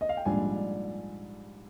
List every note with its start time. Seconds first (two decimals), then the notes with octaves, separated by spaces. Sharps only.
0.01 D#5
0.09 F5
0.17 G5
0.25 A#1 G#2 G3 D4 G#5